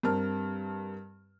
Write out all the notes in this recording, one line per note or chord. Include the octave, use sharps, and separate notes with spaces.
G2 C4 A#4 A5 F6